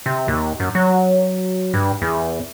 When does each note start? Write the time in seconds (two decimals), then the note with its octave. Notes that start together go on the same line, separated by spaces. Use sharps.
0.06 C3
0.28 D#2
0.60 F#2
0.75 F#3
1.74 G2
2.02 E2